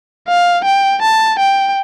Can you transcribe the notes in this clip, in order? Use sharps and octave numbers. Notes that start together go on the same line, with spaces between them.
F5
G5
A5
G5